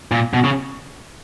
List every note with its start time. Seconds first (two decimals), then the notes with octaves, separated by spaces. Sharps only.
0.12 A#2
0.34 B2
0.44 C#3